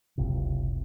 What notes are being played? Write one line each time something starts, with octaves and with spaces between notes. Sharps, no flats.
F#1 C#2 C3